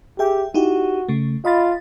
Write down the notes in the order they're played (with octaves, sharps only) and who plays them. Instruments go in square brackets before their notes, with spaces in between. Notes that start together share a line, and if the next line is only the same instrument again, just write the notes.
[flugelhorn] G4 [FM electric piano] G#4 E5 G5
[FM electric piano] D#4 E4 G4 [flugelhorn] F#4
[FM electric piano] C#3 A3
[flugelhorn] F4 [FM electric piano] D#5 B5 A6